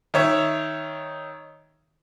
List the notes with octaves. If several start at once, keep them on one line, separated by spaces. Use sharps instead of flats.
D#3 C#5 E5